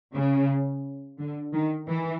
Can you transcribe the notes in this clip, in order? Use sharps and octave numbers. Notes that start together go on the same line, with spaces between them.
C#3
D3
D#3
E3